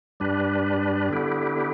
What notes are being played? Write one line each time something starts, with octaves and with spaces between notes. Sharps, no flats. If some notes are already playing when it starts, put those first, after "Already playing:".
G2 G3 D4 B4
D3 B3 E4 G4